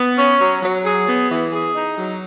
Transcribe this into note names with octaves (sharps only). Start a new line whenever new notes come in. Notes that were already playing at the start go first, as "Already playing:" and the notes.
Already playing: B3
C#4
F#3
F#3
G#4
B3
E3
G#4
D#4
F#3